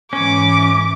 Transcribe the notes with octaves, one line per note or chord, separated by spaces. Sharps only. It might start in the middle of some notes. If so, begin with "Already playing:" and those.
G#2 E3 C#4 D6